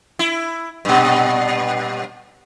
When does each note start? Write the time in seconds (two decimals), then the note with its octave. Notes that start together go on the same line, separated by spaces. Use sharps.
0.19 E4
0.85 G2 A#2